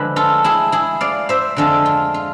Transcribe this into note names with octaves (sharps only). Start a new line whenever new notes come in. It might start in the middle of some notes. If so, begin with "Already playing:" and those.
Already playing: D3 F3 G#3 B4
F4 A4
E4 G#4
E4 G#4
D5 F5
C5 E5
F2 D3 G#3 D4 F4 A4
F4
F4